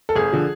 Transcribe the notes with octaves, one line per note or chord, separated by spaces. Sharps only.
A4
G1 G#4
D3 F3